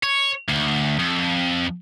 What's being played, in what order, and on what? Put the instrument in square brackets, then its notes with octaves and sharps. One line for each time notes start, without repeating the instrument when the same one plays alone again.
[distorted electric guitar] C#5
D2
F2